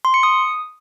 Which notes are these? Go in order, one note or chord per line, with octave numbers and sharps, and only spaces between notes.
C6
C#7
D#6